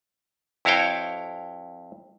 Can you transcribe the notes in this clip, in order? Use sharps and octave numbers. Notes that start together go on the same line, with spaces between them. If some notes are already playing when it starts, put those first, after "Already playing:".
F2 E4 F#4 C#5 F5 G5